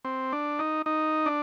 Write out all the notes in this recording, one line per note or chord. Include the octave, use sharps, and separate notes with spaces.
C4
D4
D#4
D#4
D4